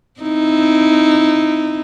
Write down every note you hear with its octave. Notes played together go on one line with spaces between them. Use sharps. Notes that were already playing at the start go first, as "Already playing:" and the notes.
C4 D#4 E4